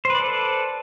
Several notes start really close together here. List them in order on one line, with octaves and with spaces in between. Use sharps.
C5 B4 D5 A4